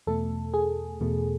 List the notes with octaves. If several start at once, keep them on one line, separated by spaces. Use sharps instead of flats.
E2 B2 A3 A4
G#4
E2 B2 A3